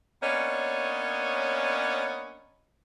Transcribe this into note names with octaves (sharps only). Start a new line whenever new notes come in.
A#3 B3 C#4 D4 C#5 D#5